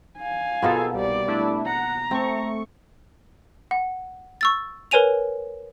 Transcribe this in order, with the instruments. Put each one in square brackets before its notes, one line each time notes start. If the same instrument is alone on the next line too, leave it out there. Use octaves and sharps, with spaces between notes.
[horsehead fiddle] F5 G#5
[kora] B2 A#3 B3 [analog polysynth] F4 G#4 A4
[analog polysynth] C2 [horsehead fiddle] G3 D5
[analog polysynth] A3 D4 E4
[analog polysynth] F#5 [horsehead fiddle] A#5
[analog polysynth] A3 C#6 [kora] C4
[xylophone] F#5
C#6 E6 A6
A#4 B4 C#5 G#5 D#7 F7